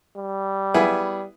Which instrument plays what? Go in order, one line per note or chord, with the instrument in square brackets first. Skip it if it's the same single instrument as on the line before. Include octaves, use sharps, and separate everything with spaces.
[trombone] G3
[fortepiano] B3 E4 G#4